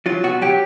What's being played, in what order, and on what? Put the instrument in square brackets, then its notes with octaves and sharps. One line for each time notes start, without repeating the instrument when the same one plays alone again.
[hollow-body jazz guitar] F#3 F4
B2 F#4
F#3 G4